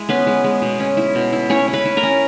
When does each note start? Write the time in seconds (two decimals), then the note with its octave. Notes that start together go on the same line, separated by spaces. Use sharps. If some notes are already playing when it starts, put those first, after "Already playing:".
Already playing: G#3 E4
0.09 B3 C#4 B4
0.27 G#3
0.44 G#3
0.62 B2
0.80 C#4
0.97 E4
1.15 B2
1.33 E4
1.50 C#4 E4 C#5
1.68 C#4
1.73 B4 B5
1.85 E4
1.97 A#4 A#5
2.03 C#4